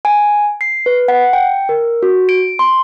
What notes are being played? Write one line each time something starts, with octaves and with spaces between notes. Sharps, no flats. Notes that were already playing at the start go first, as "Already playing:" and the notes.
G#5
C7
B4
F#5
G5
A#4
F#4
D7
C6